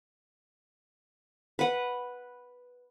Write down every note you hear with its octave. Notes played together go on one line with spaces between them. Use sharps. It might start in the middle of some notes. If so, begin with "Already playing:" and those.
B4 F#5